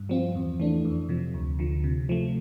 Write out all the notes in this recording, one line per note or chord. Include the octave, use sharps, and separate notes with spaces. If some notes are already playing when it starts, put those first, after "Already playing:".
Already playing: G2
F3 C4 F4
E2
E3 A3 D4
F2
C3 F3
D2
D3 F3
C3
F3 A3